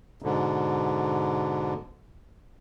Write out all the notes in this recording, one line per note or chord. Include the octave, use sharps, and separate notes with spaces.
G#2 B2 D3